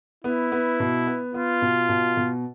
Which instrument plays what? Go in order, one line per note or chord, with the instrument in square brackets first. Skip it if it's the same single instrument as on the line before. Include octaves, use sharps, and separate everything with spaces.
[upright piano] B3 [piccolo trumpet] E4
[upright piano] B3
B2
B3
[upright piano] B3 [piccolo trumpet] F4
[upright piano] B2
B2
B2